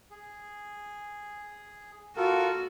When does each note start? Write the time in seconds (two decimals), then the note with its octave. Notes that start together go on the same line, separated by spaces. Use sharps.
0.11 G#4
2.17 F4 F#4 A4 A#4